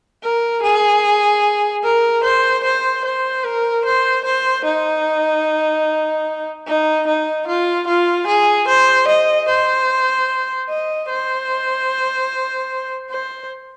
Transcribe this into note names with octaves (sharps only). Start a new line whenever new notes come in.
A#4
G#4
A#4
C5
C5
C5
A#4
C5
C5
D#4
D#4
D#4
F4
F4
G#4
C5
D#5
C5
D#5
C5
C5